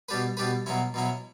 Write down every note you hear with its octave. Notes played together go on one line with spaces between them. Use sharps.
B2 G3 D4 G4 B4
B2 G3 D4 G4 B4
B2 F#3 C#4 E4
B2 F#3 C#4 E4